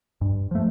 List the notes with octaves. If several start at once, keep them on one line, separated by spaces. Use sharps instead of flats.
G2
F3 A3